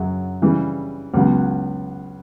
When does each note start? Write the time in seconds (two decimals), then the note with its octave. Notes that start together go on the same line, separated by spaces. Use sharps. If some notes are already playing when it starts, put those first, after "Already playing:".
Already playing: F#2 C#3 F#3
0.42 C#3 E3 G3
1.14 C#2 C#3 F#3 B3